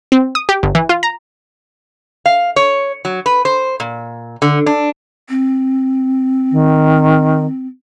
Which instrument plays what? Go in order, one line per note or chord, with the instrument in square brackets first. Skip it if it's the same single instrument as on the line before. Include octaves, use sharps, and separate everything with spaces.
[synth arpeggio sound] C4
D#6
G4
G1
E3
F4
A#5
[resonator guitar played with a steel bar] F5
C#5
F#3
B4
C5
A#2
D3
D4
[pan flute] C4
[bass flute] D#3